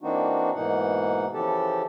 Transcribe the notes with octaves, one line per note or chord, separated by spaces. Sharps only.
E3 A#3 C4 D4 D#4 F#4
G#2 B2 E3 A#3 D#4 F#5
C#3 E3 F3 G4 A4 A5